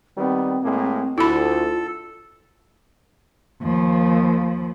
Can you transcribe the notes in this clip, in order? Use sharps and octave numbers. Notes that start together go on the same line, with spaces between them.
D#3 G3 B3 C4
A2 G#3 A#3
D2 E4 F4 A4 B5
D#2 F3